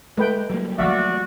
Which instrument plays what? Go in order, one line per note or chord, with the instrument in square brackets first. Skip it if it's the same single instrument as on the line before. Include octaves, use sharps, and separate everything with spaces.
[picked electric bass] G#3 [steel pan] A3 B4 G5
[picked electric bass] F#3 G3 A#3
[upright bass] F3 A3 [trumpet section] F#4 D5 [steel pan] E5 F5